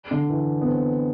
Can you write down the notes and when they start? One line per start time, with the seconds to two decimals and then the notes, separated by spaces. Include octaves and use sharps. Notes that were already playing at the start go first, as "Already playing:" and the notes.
0.11 D3
0.29 E3
0.61 B3
0.66 C4